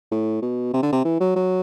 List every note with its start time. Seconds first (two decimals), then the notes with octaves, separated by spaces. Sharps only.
0.11 A2
0.42 B2
0.73 C3
0.82 D3
0.92 C3
1.05 E3
1.20 F#3
1.36 F#3